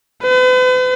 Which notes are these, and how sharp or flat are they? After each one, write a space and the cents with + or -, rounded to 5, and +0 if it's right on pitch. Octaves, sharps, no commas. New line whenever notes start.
B4 +45